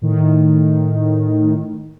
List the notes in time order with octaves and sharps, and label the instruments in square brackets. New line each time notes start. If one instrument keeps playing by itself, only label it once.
[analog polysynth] A2 D#3